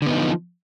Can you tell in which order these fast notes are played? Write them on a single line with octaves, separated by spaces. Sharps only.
D3 B3 D#4 F3